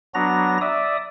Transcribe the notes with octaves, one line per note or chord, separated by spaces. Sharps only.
F#3 B3 D4 F#4 A#5 A#6
D5 E5 D#6